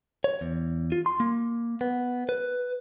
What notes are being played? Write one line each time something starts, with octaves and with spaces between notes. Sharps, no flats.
C#5
E2
F4
C6
A#3
B3
B4